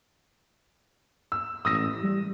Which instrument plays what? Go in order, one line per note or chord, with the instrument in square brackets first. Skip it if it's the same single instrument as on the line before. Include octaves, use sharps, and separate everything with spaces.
[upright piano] E6
[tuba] A1 [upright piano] D#6 E6 A#6
[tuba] G3